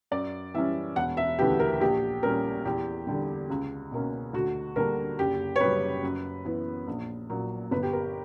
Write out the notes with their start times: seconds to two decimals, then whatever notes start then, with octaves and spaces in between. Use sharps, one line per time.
0.11 F#2 D5
0.54 E3 G3 C#4 E5
0.96 E1 F#5
1.17 E5
1.38 D2 C#3 E3 B3 G4
1.59 A#4
1.81 A#1 G4
2.23 A#2 G3 C#4 A#4
2.65 E2 G4
3.07 D3 G3
3.50 C#2
3.91 B2 A#3 C#4
4.33 D2 F#4
4.76 D3 G3 A#3 D4 A#4
5.19 F#1 G4
5.56 C#5
5.60 F#2 C#3 G3 B4
6.03 F#2
6.45 E3 B3
6.87 A#1
7.29 A#2 F#3 A#3
7.71 G1 B4
7.83 G4
7.93 A#4